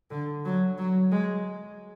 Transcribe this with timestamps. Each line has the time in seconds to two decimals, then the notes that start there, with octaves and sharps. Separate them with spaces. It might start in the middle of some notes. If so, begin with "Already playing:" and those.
0.11 D3
0.45 F#3
0.78 F#3
1.11 G#3